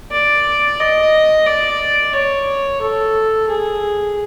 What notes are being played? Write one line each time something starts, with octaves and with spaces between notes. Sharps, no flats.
D5
D#5
D5
C#5
A4
G#4